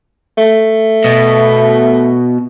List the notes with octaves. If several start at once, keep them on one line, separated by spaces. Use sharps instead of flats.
A3
B2